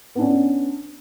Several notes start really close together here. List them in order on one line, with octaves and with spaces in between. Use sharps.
B3 D4 C#4